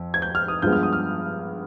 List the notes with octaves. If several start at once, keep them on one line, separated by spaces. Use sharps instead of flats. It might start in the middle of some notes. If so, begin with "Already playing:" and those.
Already playing: F2
G#6
G6
F6
D#6
G2 F3 G#3 B3 G6
F6
D#6
F6